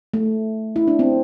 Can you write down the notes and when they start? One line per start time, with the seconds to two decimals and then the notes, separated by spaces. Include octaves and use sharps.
0.14 A3
0.76 E4
0.88 D4
0.99 C4